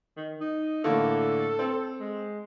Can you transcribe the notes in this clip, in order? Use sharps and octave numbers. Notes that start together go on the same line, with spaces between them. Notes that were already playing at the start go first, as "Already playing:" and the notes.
D#3
D#4
A2 D3 A#3 A4
C4
G#3